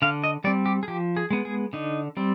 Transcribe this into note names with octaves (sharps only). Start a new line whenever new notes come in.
D3 F5
D#5
G3 C4 D5
G4
G#4
F3 G4
G#4
G#3 B3
G#4
D3 D#4
G3 C4